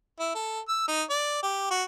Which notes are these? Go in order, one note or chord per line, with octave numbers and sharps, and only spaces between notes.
E4
A4
E6
D#4
D5
G4
F#4